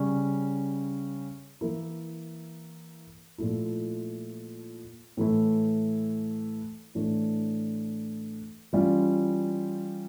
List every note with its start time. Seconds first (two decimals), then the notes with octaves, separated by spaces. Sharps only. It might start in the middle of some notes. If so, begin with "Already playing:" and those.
Already playing: C#3 G3 C#4
1.61 E3 A#3 E4
3.38 A#2 F3 A3 E4
5.17 A2 E3 A3 E4
6.95 A2 E3 A3 D4
8.73 E3 G3 C#4 F4